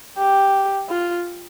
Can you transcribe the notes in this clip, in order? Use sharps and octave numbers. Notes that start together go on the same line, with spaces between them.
G4
F4